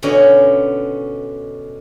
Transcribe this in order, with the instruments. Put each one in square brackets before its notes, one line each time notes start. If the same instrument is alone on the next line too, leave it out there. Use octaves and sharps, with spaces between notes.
[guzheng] B2 D3 C#4 F#4 D#5 G#5